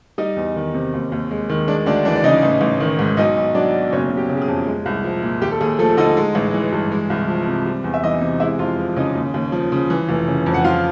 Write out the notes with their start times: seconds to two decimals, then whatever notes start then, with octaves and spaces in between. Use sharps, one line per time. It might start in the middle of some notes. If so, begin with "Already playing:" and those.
0.18 G3 D#4 D#5
0.37 E2
0.56 D#3
0.74 C3
0.94 D#2
1.12 D#2
1.31 G#3
1.49 D#3
1.68 G#3 D4 D5
1.86 D2 D4 D5
2.05 E3 D4 D5
2.16 D5
2.24 C#3 D#4 D#5
2.43 A1
2.61 A1
2.80 D#3
2.99 G#2
3.17 B1 D#4 D#5
3.36 B1
3.55 F#3 D4 D5
3.74 B2
3.92 F#1 C#4 C#5
4.11 F#1
4.17 G4
4.29 C#3
4.37 G4
4.42 G#4
4.48 F2
4.67 G#3
4.86 C2
5.04 F3
5.22 A#2
5.42 D#2 G4
5.52 A4
5.61 D#2 G#4
5.79 F3 A3 A4
5.97 D3 D#4 D#5
6.17 G#3
6.35 A1
6.54 E3
6.72 G2
6.92 G#3
7.10 C2
7.28 F3
7.48 C3
7.66 G3
7.84 E2
7.94 E5
8.03 E3 D#4 D#5
8.21 C3
8.40 G#3 E4 E5
8.59 F2 F4 F5
8.79 F3
8.96 C#3 D#4 D#5
9.15 D#2
9.34 D#2
9.52 F3
9.72 C#3
9.90 E3
10.09 F1
10.28 C#3
10.46 F2
10.54 F#5
10.64 F3 F4 F5